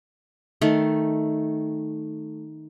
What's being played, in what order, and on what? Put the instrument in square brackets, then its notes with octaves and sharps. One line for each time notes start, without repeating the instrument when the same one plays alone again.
[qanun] D#3 A3